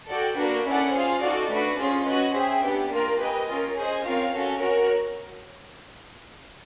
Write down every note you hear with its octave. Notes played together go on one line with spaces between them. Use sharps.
F#4 A4 D5 G5
A#3 D4 F#4 B4
C#4 E4 A4 D5 F#5
F4 G#4 C5 F5
D#4 F#4 A4 D5
A3 D4 F#4 B4
C#4 F4 G#4 C5
C#4 F#4 B4 D#5
G#4 C5 E5 G5
B3 D4 G4
A#3 D4 F4 A#4
G4 B4 D#5 G#5
C#4 F4 A#4
G#4 C5 D#5 G#5
C4 F4 A#4 C#5 F5
C#4 F#4 A4 C#5
F#4 A#4 C#5